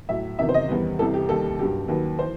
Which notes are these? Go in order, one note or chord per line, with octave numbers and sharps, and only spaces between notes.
A2 F#3 E5
E2 C3 D#3 F#3 E5
C5
D#5
E2 D#3 G3 B4
C2 C3 E3 G3 A4
G4
D#2 D#3 G3 A4
G2 F#3 G4
D#2 D#3 F#3 B4
E3 C5